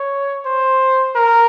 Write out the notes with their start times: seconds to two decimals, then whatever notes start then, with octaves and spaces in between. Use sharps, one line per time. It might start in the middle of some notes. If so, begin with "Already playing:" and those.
Already playing: C#5
0.45 C5
1.16 A#4